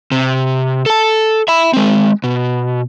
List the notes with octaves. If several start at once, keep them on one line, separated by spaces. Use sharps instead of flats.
C3
A4 A5
E5 B5
G#3 C4
B2